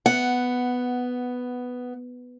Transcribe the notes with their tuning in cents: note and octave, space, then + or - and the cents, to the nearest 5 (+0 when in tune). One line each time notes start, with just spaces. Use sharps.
B3 +5 F#5 +0